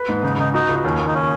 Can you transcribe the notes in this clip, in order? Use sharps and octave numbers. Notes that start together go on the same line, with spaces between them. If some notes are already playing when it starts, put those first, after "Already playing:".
Already playing: B4
G#2
C#3 D#4
C#3 D#4
D#4 F#4
C#2
D#2 C#4
D#2
D#4
C#4